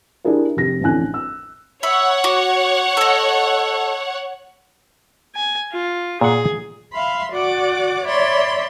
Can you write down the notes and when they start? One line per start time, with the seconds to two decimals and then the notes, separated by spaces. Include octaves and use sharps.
0.24 D4 E4 G4 G#4 A#4
0.57 F1 G4 A#6
0.81 A1 F2 A2 D3 G#5 F#6
1.14 E6
1.83 C#5 E5 F#5 B5
2.24 F#4 D6
2.97 A4 D#5
5.35 G#5
5.72 F4
6.21 A#2 G#4 F#5
6.93 E5 F5 B5 C6
7.32 F#4 D5 F#5 D6
8.05 C#5 D5 E5 B5 C6